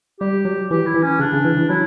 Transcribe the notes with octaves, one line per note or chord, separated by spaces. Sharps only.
G3 G4
F#3
E3 G4
E4
E3
C#4
C#3 D4
C#3
E3
E3
F#3 E4